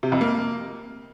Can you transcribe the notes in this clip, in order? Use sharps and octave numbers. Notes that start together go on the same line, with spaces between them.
C3
F2
A#3